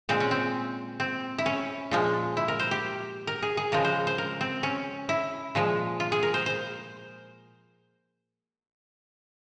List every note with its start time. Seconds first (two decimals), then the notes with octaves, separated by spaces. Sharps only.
0.09 A#2 G#3 C4
0.20 C#4
0.31 C4
1.00 C4
1.38 E4
1.46 C#4
1.91 A#2 F3 G#3
2.37 E4
2.48 A#4
2.59 C5
2.71 G4
3.27 A#4
3.42 G#4
3.57 G#4
3.72 C#3 F3 G#3 A#4
3.85 C5
4.07 C5
4.18 A#4
4.41 C4
4.63 C#4
5.09 E4
5.55 A#2 F3 G#3
6.00 F4
6.12 G#4
6.23 A#4
6.34 C5
6.46 C5